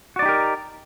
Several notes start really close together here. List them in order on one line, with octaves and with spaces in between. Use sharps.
F#4 D5 D#4 G4 A#4